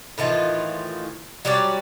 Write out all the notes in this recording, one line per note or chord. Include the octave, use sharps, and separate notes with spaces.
A2 D#3 E3 F4
F#3 G3 C#4 D5